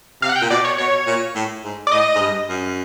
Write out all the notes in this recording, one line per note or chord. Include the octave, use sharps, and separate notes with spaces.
C3 F5
F#5
G5
A#2
B2 D5
C#5
B2 C#5
A#2
A2
G#2
D5
A2 D#5
G#2
G2
F#2